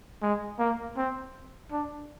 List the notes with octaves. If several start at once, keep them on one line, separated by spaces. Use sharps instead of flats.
G#3
A#3
C4
D4